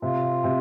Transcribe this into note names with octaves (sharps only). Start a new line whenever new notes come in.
C3 F4
C3